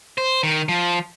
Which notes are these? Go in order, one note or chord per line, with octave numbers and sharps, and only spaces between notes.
C5
D#3
F3